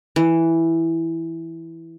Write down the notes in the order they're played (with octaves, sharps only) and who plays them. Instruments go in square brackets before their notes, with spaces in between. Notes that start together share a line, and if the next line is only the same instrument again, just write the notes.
[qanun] E3